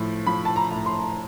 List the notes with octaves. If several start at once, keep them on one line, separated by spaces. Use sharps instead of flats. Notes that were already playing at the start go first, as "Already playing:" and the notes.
Already playing: A2 F3
F3 B5
A5
A#5
A2
C6